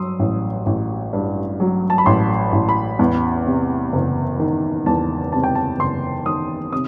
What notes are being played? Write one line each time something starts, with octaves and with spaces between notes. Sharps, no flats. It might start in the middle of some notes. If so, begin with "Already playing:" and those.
Already playing: G2 F#3 C6 D#6 E6
A1
A1
G2
F#3
A5
B5
A1 C6
A1
B5
E2
C3
F#1
D#3
E2 A5
C3 A5
G5
A5
F#1 C6
D#3 D#6
C3 D#6